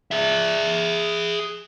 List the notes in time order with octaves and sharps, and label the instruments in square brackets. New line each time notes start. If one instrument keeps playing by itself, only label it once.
[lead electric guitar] G#4 E5